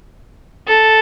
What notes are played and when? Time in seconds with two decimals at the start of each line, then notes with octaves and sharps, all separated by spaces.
0.68 A4